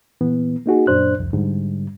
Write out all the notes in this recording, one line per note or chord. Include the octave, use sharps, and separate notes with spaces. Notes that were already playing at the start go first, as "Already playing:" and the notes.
A#2 E3 B3
A#3 D#4 F#4 G#4
F#2 A#2 D4 C5 F#6
C2 F2
G#2 D3 G3